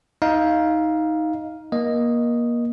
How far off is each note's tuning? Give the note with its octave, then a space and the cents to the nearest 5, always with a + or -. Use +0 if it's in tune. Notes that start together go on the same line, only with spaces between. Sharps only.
D#4 +15 F5 +0
A#3 +30 D#5 +0